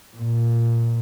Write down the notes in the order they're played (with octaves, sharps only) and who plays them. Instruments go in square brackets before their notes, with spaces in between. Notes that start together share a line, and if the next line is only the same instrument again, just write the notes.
[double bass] A#2